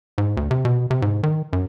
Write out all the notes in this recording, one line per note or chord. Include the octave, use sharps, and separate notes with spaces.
G#2
D2
C3
B2
C3
G#2
D#3
F#2